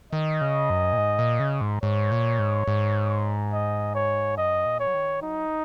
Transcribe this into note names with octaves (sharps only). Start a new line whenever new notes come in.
D#3 D#5
C#3
F#2
A#2
G#2
A#2
C#3
G#2
G#2 C#5
A#2
G#2
G#2
D#5
C#5
F#2 D#5
A#2
C#5
F#3
D#3
F#3 D#4